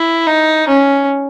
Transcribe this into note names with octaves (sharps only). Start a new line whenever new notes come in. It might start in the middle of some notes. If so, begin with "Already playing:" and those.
Already playing: E4
D#4
C#4